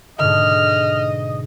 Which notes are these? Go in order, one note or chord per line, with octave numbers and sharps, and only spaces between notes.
G#2 B2 D3 D#5 F6